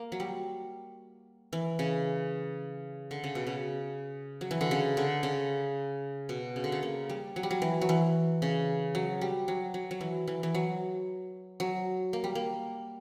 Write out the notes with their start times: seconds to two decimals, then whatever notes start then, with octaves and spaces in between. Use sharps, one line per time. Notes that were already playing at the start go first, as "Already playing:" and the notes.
Already playing: A#3
0.12 F#3
0.20 G3
1.53 E3
1.79 C#3
3.11 D3
3.24 C#3
3.35 B2
3.47 C#3
4.41 F#3
4.51 E3
4.61 D3
4.71 C#3
4.97 D3
5.23 C#3
6.29 B2
6.56 C#3
6.64 D3
6.72 C#3
6.83 A#3
7.09 G3
7.36 F#3
7.43 G3
7.51 F#3
7.62 E3
7.81 F#3
7.89 E3
8.42 C#3
8.95 F#3
9.21 G3
9.48 F#3
9.74 F#3
9.91 F#3
10.01 E3
10.27 E3
10.43 E3
10.55 F#3
11.60 F#3
12.13 A#3
12.24 G3
12.35 A#3